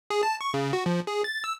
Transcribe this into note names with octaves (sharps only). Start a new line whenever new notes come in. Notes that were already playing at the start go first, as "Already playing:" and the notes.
G#4
A5
C#6
C#3
F#4
F3
G#4
A6
E6